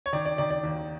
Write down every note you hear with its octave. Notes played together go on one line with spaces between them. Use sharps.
C#5
D#3 D5
D5
D#3 D5
D5
D#2